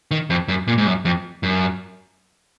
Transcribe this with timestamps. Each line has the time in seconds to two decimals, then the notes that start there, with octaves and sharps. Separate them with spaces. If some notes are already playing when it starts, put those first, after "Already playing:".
0.11 D#3
0.30 F2
0.48 F#2
0.67 A#2
0.78 G#2
0.87 F#2
1.05 F2
1.43 F#2